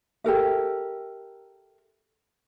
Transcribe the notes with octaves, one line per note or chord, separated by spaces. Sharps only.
G4 A4 A#4 E5